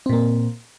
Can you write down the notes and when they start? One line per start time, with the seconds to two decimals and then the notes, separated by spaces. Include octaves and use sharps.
0.06 C4
0.09 A#2
0.13 A#3